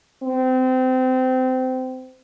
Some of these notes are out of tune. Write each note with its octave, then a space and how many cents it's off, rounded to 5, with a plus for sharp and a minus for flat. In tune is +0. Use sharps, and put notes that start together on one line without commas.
C4 -25